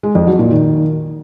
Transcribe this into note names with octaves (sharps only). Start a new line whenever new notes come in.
G#3
F2
F#3
A#2
D#3